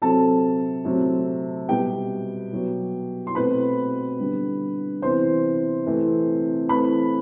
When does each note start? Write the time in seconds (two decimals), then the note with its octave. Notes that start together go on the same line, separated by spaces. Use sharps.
0.02 C3 F#3 C4 A4 A5
0.85 C3 F#3 A3 C4
1.69 B2 G3 B3 G4 G5
2.52 B2 F#3 B3
3.27 C6
3.35 B2 A3 C4 B4 B5
4.20 D3 G3 B3
5.02 C3 E3 B3 C5 C6
5.86 C3 E3 A3 C4
6.69 E3 A3 C4 B4 B5